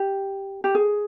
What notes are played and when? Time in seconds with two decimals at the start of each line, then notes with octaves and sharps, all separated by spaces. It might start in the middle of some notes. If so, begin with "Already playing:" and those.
Already playing: G4
0.64 G4
0.75 G#4